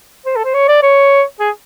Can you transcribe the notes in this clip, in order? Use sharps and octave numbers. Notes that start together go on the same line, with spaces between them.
C5
A4
C5
C#5
D5
C#5
G#4